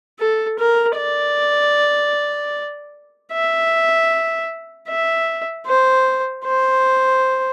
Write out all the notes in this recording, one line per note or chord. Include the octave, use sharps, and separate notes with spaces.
A4
A#4
D5
E5
E5
C5
C5